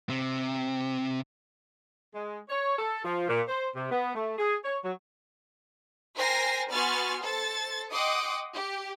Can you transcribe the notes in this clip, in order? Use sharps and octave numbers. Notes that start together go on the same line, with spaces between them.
C3
G#3
C#5
A4
F3
A#2
C5
C3
B3
A3
G#4
C#5
F#3
A#4 C5 G5 G#5 A#6 C7
B3 F#4 G#5 C6 F6 A6
A4 C5 A6
D#5 F#5 G5 C6 D6 D#6
G4